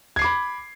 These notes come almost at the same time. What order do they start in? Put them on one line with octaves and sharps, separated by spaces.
G#6 C7 D6 B5